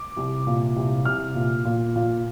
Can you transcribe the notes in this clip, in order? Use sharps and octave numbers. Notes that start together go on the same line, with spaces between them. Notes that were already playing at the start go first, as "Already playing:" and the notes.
Already playing: D6
C2
A#2
C2
C2 F6
A#2
A#2
A#2